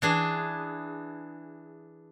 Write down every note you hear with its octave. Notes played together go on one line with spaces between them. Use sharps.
E3 D4 G#4